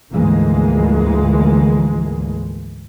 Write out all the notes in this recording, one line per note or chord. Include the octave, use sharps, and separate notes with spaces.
D2 G#2 E3 F3 G#3 A#3